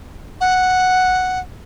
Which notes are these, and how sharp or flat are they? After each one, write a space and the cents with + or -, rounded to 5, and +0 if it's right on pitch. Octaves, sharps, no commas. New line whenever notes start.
F#5 -5